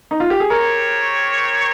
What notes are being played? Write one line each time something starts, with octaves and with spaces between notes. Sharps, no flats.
D#4
F4
G4
G#4
C4 G4 A#4 C#5